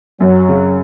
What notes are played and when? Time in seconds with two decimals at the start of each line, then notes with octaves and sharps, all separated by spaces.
0.20 F#2 F#3
0.48 C#3